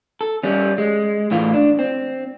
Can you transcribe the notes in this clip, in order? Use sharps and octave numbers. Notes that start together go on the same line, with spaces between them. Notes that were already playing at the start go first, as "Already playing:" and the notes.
A4
G3 C#4
G#3
A2 E3 F4
D4
C4